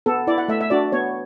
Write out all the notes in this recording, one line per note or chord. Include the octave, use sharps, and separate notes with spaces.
B3 A4
E4 D5
F#5
A3 E5
E5
D4 F#4 D5
B3 C#5